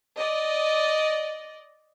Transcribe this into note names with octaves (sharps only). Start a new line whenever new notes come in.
D5 D#5